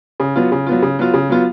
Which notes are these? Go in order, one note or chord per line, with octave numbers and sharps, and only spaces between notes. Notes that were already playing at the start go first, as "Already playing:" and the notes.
C#3
F#3 B3 F4
C#3
F#3 B3 F4
C#3
F#3 B3 F4
C#3
F#3 B3 F4